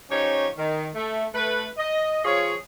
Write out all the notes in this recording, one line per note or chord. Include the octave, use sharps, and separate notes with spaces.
F3 C#4 D#4 G4 C#5
D#3
A3
A3 B4
D#5
F3 F4 G#4 C#5